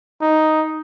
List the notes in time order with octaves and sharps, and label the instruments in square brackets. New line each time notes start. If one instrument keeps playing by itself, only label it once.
[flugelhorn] D#4